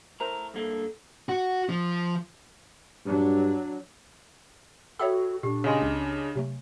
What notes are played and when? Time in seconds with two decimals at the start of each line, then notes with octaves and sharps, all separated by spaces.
0.20 A3 E4 A#4 C5 A#5
0.54 G2 A#3 D4 A4
1.29 F#4
1.69 F3
3.05 G2 F#3 D4
4.99 F#4 A4 C#5 E5 G5 B5 E6
5.43 A#2 D4 G4
5.64 C#3 D#5 F5 G#5 C6
5.82 C#2
6.35 C3 F#3 A3